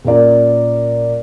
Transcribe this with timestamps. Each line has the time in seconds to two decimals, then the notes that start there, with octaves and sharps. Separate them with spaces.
0.05 A#2 C#4 A#4 D5